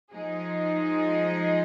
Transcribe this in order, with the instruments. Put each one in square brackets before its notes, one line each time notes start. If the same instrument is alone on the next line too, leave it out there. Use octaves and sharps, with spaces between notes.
[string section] F3 G#3 D#4 G#4